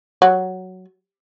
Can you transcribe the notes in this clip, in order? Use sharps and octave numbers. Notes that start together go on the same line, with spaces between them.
F#3